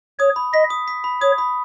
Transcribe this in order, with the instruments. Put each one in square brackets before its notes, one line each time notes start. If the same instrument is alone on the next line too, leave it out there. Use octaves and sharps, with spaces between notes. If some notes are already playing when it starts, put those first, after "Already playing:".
[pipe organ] C#5 [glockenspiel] D#6
[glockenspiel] B5
[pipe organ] D#5 [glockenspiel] B6
[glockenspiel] D#6
B6
B5
[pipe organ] C#5 [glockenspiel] D#6
[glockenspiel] B5